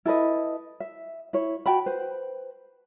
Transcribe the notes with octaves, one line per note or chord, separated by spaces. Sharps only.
E4 A4 B4 D#5
E5
E4 C#5
F#4 G5 A5 B5
B4 C5